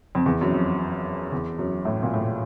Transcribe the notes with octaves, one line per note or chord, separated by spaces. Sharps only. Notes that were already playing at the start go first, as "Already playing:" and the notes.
F2
E2
F#2
F2
E2
F#2
A2
A#2
A2